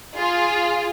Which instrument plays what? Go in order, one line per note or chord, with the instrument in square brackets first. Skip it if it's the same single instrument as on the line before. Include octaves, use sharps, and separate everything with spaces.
[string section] F4 G#4